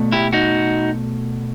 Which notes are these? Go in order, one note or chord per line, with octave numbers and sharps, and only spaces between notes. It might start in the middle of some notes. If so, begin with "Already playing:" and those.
Already playing: B2 A3
E4 G4
D#4 F#4